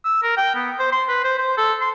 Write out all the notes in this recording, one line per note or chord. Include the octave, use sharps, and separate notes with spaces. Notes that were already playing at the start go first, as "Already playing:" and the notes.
E6
A#4
G5
B3
C5
C6
B4
C5
C5
A4
C6